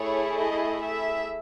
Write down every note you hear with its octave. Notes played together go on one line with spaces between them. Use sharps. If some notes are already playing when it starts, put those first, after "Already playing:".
Already playing: A3 E4 G#4 C#5
D#5
E5